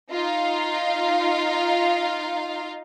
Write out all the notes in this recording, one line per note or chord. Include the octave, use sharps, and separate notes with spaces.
D#4 F4 F5